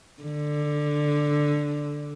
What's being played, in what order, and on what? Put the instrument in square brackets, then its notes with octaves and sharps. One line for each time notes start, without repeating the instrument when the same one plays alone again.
[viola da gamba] D3